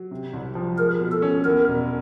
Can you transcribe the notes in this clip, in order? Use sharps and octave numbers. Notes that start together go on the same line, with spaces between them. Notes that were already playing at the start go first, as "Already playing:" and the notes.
Already playing: F#3
C3
C2
F3
G#3 A#4
B2
A4
C#4
E2 A#4
E1